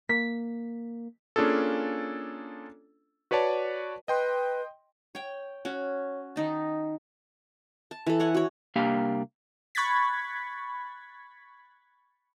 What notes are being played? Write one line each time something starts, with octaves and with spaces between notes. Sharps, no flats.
A#3 B6
A#3 C#4 D4 F4 G#4 A4
F#4 B4 C#5 D5 A5
B4 D#5 G5 C6
C#5 G5
C#4 F#4
D#3 D#4 A5
A5
E3 A4
C#5 F#5 G#5 C#6
F#4 C#5
C2 A#3 D4 G4 F5
B5 C#6 F#6 G#6 A6 B6